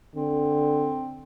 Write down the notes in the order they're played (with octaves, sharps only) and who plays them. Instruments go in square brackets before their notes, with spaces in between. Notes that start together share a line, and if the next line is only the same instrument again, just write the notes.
[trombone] D3 [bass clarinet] C4